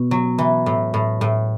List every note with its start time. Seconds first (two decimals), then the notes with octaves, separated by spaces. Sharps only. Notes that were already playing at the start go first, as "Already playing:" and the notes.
Already playing: B2
0.11 F#3
0.38 E3
0.66 A2
0.94 A2
1.21 A2